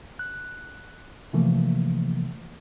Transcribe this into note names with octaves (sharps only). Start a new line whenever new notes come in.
F#6
C3 E3 F3 A3 A#3